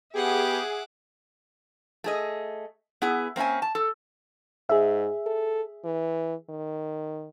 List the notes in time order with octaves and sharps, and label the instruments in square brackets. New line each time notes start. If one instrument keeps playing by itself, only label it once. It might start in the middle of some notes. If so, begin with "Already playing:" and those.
[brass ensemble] B3 G4 [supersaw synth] G#4 [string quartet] E5 F#5 D6
[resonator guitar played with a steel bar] A3 G#4 D#5
B3 E4 G#4
A#3 C4 C#4 E5 G#5
A5
A4
[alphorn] G#2 [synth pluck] G#4 E5
[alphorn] A4
E3
D#3